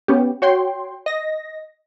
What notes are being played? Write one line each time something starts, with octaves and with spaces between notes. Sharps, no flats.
B3 C#4 G4
F#4 C#5 G5 C6
D#5 A#6